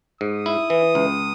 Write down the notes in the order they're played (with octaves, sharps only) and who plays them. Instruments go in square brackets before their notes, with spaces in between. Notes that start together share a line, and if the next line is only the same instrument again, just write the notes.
[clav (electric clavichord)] G#2 [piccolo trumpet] D#6
[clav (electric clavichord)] E4
E3
C#2